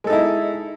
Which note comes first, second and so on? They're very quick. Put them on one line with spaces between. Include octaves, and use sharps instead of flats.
G#3 A4 D#4 E4